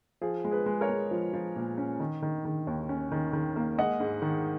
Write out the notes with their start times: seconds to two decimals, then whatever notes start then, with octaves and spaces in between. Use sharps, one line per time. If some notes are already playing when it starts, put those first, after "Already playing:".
0.21 F3 G#4
0.44 G#3
0.51 G#4 B4
0.66 G#3
0.81 A#4 C#5
0.89 G#3
1.11 F3
1.33 F3
1.56 A#2
1.78 C#4
2.00 D#3
2.22 D#3
2.45 D#3
2.67 D#2
2.89 C#4
3.12 D#3
3.33 D#3
3.56 A#3
3.78 G#3 D#5 F#5
4.00 G#2
4.22 D#3